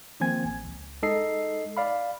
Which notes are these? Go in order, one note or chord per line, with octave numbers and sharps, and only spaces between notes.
D#3 F3 A#3 C4 G#5 G#6
A1
C#2
G#3 D#4 A4 D#5 C7
D5 F5 B5